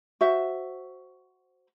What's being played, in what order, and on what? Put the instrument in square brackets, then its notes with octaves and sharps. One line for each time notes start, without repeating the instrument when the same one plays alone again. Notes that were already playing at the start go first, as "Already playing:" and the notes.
[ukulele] F#4 C5 E5